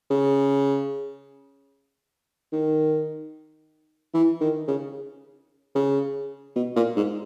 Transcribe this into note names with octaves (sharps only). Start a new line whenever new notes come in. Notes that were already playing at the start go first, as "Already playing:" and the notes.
C#3
D#3
E3
D#3
C#3
C#3
B2
A#2
G#2